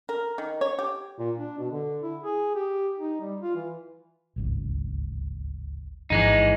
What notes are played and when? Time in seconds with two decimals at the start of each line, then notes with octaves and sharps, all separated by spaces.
0.09 A#4
0.38 D#3
0.61 C#5
0.79 G4
1.19 A#2
1.38 D4
1.58 B2
1.71 D3
2.02 E4
2.23 G#4
2.55 G4
2.99 D#4
3.21 G3
3.41 F4
3.56 E3
4.36 D1 G#1 C#2
6.10 A1 G#2 E3 F3 G#3 D#4